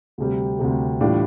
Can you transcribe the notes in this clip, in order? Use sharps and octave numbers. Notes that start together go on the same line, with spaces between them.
D2 C3 G3
D2 C3 G3
A2 E3 G3 D4 F4